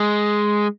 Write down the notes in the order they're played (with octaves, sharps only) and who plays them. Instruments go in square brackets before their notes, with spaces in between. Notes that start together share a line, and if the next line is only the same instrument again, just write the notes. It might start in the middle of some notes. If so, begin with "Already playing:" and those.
Already playing: [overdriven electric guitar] G#3